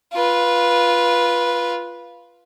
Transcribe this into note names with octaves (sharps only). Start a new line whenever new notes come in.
F4 B4